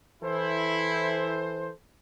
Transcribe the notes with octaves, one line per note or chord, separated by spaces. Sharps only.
E3 E4 A4 C5